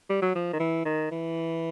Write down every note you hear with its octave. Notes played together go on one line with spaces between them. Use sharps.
G3
F#3
F3
D#3
E3
D#3
E3